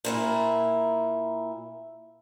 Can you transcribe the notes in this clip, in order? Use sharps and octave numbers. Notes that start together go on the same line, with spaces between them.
A#2 A#3 E4